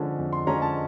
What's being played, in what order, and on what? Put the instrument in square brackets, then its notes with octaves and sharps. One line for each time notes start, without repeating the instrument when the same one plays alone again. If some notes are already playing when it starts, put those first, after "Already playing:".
Already playing: [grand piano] D3 F3 G#3 C#4
F2
C6
D3 F3 G#3 C#4 A#5
A5